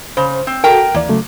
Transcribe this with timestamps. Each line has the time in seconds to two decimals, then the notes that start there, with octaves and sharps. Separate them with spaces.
0.17 C#3 C5
0.47 C4
0.64 F#4 A4 A#4 G5
0.94 D#2 E3 A#3 D5
1.09 C#3 F#3 A3